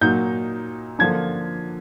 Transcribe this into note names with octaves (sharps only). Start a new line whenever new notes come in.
A#2 F#3 A#3 D#4 G6
D3 F3 A#3 D4 G#6